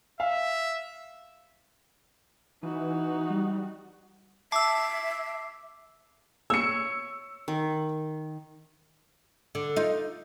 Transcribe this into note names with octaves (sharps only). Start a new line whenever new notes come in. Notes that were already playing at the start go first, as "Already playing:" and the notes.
E5 F5
E3 D#4 F#4
G3
E5 A5 D6 E6 C7
C#5 E6 C#7
D#3
D3
D#4 F4